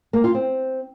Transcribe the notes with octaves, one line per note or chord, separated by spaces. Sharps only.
A#3
F4
C4